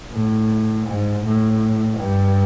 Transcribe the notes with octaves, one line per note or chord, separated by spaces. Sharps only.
A2
G#2
A2
G2